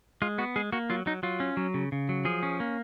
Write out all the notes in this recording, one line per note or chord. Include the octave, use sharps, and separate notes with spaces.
G#3 F4
B3 F#4
G#3 G#4
A#3 F#4
F#3 F4
F#3 D#4
F#3 F4
C#4
F#3
C#3
C#3
F#3
F3 G#4
C#4
A#3